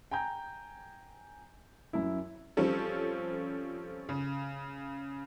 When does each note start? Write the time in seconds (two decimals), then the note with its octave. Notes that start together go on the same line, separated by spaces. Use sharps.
0.11 G5 G#5 A#5 G6
1.93 F#2 E4
2.57 F3 G3 C4 C#4 A4
4.09 C#3